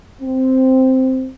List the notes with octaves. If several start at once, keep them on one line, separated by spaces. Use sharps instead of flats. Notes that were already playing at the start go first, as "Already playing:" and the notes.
C4